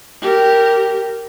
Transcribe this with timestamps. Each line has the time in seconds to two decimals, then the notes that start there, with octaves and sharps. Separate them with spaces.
0.22 G4 A#4